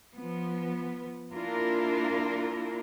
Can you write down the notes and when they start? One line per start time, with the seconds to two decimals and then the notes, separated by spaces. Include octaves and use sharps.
0.14 F3 B3
1.32 A#3 D4 E4 F4 A#4